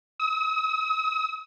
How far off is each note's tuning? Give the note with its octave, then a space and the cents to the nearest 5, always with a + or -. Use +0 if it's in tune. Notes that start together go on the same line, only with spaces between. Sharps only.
D#6 +45